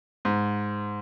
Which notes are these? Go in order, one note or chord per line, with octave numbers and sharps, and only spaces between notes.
G#2